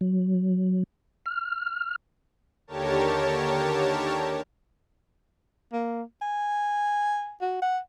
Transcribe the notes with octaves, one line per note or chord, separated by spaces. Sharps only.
F#3
F6
D#2 D3 G4 A#4 C#5 A5
A#3
G#5
F#4
F#5